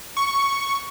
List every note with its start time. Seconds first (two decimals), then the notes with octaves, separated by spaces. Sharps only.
0.17 C#6